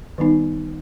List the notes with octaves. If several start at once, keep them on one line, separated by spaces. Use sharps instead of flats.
D#3 G3 B3 D#4